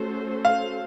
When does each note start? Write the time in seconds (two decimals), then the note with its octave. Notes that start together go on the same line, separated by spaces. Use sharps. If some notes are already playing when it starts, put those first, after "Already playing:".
Already playing: A3 C#4 F#4 A4 C5
0.45 F5